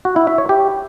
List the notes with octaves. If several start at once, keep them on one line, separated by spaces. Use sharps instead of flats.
F#4
E4
E5
C#5
G4